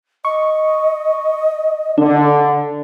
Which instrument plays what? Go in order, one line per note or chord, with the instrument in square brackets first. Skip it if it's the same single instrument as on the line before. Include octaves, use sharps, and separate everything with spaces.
[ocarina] D#5 [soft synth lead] C#6
[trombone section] D3 [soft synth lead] D4